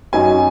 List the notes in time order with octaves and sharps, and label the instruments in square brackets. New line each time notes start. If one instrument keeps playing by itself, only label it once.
[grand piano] F#2 F#3 D#4 G#5